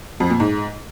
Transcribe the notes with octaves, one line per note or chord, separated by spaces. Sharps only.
F2
A#2
G#2